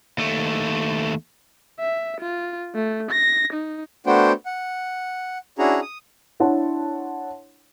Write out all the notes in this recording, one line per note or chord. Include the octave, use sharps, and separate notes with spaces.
D#2 A3
E5
F4
A3
A#6
D#4
A3 B3 D4 F#4 C5 G5
F#5
C#4 D4 E4 F#4 G#4 A#5
D#6
D4 E4 C#5 F#5 A5 C6